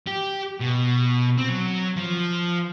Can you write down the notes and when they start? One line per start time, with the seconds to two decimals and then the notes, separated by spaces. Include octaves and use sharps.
0.07 G4
0.60 B2
1.38 C4
1.49 F#3
1.98 F3